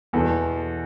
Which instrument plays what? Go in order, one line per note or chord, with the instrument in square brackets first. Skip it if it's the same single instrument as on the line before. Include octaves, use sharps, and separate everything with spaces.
[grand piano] E2 B2 A4